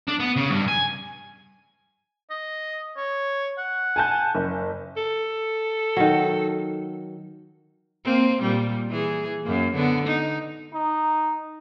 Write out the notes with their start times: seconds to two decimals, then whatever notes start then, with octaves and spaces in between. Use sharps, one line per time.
0.08 D4
0.20 B3
0.36 C#3
0.50 G2
0.68 G#5
2.30 D#5
2.97 C#5
3.58 F#5
3.96 G#5 A5 G6
4.35 F#1
4.97 A4
5.97 D#3 F#3
8.05 A#3 C4
8.42 A#2 G3
8.89 E3 G#4
9.44 F#2 A#3
9.74 D3 B3
10.07 D#4
10.74 D#4